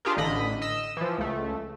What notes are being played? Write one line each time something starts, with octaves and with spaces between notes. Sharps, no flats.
D4 F4 G4 G#4 A#4
A1 D3 D#5 B5
D#5 E6
E3 F3
C#2 A3